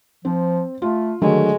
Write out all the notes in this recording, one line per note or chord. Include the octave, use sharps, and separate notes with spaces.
F3 C4
A3 F4
D3 D#3 F#3 G#3 A3